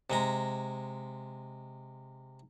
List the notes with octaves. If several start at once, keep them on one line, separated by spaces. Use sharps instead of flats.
C3 G#3 A#5